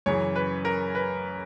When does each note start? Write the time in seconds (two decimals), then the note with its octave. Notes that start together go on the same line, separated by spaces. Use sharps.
0.06 F#2 C#3 E3 C#5
0.36 B4
0.65 A#4
0.95 B4